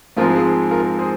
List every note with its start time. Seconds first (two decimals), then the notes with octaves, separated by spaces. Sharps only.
0.17 G#2 F3 G#3 C4 F4 A#4
0.35 G#4
0.71 F4 A#4
0.98 G#4 C5